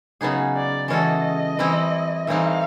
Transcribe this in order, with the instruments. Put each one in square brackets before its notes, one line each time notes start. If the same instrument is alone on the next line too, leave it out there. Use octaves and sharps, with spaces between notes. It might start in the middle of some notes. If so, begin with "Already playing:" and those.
[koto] C#3 F#3 B3 D#4 G#4
[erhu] D5
[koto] E3 G#3 C#4 F#4 A4 [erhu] D#5
[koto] E3 G3 C4 E4
[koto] A2 E3 G3 C4 D#4 [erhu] F5